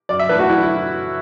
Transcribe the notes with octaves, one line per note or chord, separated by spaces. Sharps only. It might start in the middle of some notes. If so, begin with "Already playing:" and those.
F#2 D5
E5
E3 A3 D4 B4
F#4
F#2 E4
E4